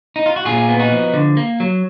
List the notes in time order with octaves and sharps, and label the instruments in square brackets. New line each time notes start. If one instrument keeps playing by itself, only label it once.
[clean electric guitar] D#4
F4
F#4
A#2 F4 G#4
B3
D#4 F#4
F3
D3
A#3
F#3